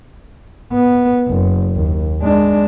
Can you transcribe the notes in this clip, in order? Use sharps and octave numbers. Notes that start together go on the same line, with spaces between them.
B3
F#1
D#2
G#3 D4